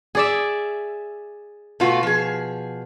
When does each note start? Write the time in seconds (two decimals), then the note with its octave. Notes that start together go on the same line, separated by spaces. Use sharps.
0.15 G#4 D5 E5
1.80 B2 A3 F4 F#4
2.03 F3 G#4